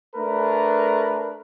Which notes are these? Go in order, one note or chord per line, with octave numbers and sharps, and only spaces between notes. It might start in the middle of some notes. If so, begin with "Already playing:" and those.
A3 D4 A#4 B4